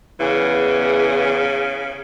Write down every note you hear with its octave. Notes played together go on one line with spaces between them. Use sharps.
E2 C#3 E3 G#4